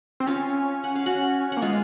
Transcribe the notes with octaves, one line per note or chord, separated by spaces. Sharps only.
C4
C#4 F4 F5
F#5
F5
F#4 F#5
A#3 F#5
G#3 F4 F5